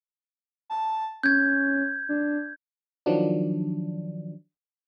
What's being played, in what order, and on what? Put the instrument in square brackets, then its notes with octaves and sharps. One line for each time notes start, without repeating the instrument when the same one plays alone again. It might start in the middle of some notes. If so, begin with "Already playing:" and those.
[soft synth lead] A5
[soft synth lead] C#4 [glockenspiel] G6 G#6
[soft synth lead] D4
[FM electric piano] D#3 F3 F#3 D4